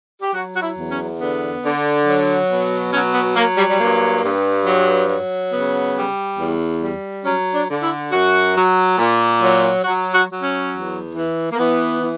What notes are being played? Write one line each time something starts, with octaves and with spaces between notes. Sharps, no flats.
G4
F#3 F#4
F#4
E4
E2
C#4
D3 B3
D3
F#3
B2
F#3 C#4
B3
F#3 A#3
G3
G3
G2 A#3
G2
F#3
F#3
C#3 B3
G3
E2
G3
F#3 C#4
D4
D3
E4
F#2 F#4
F#3
A#2
F#3
F#3 F#4
F#4
F#3
C#4
E2
E3
A#3
E3 B3
E3